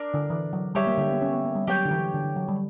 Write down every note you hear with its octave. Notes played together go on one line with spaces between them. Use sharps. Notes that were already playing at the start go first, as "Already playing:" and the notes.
Already playing: D4 A#4 D5
D3
E3
F#3
G3 G4 C#5 E5
A#3
D3
B3
C#4
B3
A#3
G3
F#3 G4 C#5 G5
D3
E3
D3
D3
F#3
G3